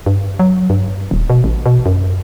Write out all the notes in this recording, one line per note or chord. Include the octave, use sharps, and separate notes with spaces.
G2
F#3
G2
D#1
B2
A1
B2
F#2